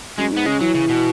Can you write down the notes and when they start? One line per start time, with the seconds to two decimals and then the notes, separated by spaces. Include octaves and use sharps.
0.18 F#2 G#3
0.32 G#2 B3
0.46 C#3 G#3
0.61 E3 F#3
0.75 C#3
0.89 B2